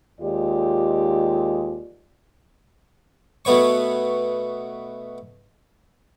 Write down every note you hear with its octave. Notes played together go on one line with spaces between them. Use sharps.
D#2 G#3 F4 G4 D5 D#5
B2 A3 B3 C#5 C#6